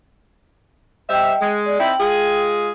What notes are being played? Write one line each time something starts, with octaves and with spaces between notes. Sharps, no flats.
G3 C5 D#5 E5 G5
G#3
D5
C4 D#4 E4 G5 F#7
G#3 F4 G#4